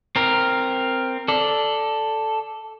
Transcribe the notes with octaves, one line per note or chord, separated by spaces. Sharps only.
C4 A#4
A4 D5